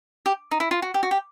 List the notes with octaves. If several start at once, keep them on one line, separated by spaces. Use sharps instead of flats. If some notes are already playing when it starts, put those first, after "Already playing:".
G4
D#4
E4
F4
F#4
G4
F#4
G4